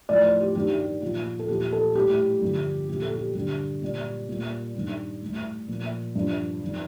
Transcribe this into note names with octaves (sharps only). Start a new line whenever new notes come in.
A2 F3 D5
C5
G4
G2 D#3 G3 G4
G4
A#2 F3 F4
A4
A#2 F3 G4
A4
A2 G3 G4
G2 D3 F3
A#2 F3 G4
A4
G4
G2 D3 G3 G4
A#2 G3
A#2 G3
G2 D#3 G3
A2 G3
A#2 F3
G2 F3
F2 D#3 G3